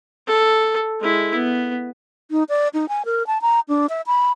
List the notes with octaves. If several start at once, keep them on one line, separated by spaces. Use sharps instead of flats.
A4
G#3 E4
B3
D#4
D5
D#4
G#5
A#4
A5
A#5
D4
E5
B5